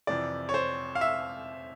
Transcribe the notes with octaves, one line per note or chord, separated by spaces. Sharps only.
F2 C3 E3 D5
C#5
C5
F5
E5